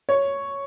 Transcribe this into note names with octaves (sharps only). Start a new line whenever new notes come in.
C#5